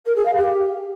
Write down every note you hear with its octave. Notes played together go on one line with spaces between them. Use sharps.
A#4
G#4
F5
G4